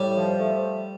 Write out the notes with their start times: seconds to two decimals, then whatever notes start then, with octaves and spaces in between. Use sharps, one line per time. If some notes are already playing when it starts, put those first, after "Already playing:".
Already playing: A2 G3
0.14 F3
0.38 A3